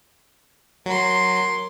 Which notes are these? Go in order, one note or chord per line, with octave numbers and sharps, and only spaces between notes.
F#3 A#4 C6